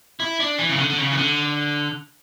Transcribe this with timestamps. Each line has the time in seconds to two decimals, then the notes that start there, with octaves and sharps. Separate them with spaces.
0.20 E4
0.40 D4
0.59 E3
0.69 C#3
0.78 D3
0.89 D3
0.98 C#3
1.12 E3
1.17 D3